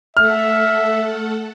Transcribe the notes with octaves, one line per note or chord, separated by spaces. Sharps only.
A3 A4 E5 F#5 F6